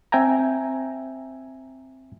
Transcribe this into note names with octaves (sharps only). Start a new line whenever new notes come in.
C4 E5 G5 G#5 A#5